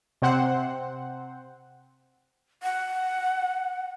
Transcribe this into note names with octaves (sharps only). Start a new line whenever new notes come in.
C3 C4 C5 F#5
F#5